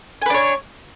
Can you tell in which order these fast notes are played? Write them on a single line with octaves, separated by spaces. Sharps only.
G#5 B4 D4 C#5